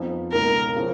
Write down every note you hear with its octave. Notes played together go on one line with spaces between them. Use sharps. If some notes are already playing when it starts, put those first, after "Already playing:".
Already playing: F2 F3 B3 D#4
C#2 B2 A#3 D#4 A#4
C#3 F3